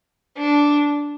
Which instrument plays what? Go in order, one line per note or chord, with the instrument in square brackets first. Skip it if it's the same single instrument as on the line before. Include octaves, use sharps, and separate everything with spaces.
[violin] D4